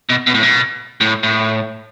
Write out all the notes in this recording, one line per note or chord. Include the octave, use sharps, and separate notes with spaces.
B2
B2
A2
B2
A2
A2